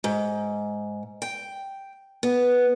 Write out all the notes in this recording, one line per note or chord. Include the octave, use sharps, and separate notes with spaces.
G#2
G5
B3